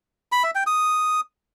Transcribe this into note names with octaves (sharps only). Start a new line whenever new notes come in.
B5
E5
G5
D#6